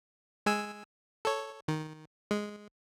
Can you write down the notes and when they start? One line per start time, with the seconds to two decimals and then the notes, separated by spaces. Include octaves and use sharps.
0.46 G#3 G#5 E6
1.25 A4 C#5
1.68 D#3
2.31 G#3